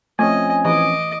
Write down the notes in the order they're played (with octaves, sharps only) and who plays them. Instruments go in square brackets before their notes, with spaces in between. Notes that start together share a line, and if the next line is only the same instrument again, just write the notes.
[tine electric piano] F3 C4 C#4 [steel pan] A3 [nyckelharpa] D#5 [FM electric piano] G#5
[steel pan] E3 [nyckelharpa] D#5 D6